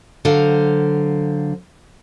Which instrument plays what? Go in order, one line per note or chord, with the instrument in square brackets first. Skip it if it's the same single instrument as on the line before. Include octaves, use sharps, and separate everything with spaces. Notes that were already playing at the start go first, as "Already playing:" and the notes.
[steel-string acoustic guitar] D3 F#3 C5 F5